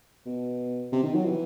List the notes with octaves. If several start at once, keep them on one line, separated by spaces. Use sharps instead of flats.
B2
C3
D#3
F#3
E3